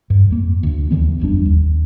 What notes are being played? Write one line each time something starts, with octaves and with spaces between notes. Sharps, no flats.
G2
F2 A#3
D2
D#2 D3 E3 B3
G1 F2 G3 D4
D#2